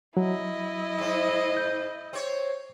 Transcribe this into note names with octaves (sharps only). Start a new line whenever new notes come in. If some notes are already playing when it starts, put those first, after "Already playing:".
F#3 E4 D#5
G#2 C4
G6
C4 C#5